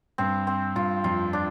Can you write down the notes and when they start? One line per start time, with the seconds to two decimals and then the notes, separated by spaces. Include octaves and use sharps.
0.18 G2 C4
0.47 C4
0.75 G2 F4
1.04 F2 F4
1.33 D4